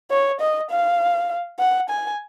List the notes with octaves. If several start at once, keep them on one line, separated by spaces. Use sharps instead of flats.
C#5
D#5
F5
F#5
G#5